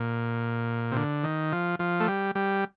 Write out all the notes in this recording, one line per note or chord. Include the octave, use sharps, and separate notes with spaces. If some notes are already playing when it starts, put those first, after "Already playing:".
Already playing: A#2
C3
D3
D#3
F3
F3
A3
G3
G3